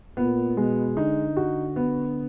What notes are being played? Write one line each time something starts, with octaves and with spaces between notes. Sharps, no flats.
A#2 B3
B2 G#3
D3 D#4
F#4
B3